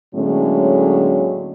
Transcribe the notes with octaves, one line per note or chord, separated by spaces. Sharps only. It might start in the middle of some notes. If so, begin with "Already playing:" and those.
A2 D3 F#3 G#3 A#3 C#4